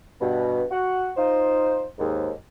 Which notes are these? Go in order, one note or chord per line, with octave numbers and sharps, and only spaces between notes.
G2 B2
F#4 F#5
D#4 F4 C5
D#2 G#2